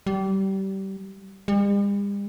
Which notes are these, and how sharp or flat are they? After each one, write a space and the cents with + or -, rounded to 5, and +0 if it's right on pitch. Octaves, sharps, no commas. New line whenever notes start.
G3 -25
G3 +45